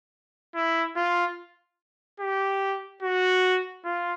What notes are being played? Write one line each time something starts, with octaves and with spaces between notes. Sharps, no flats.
E4
F4
G4
F#4
F4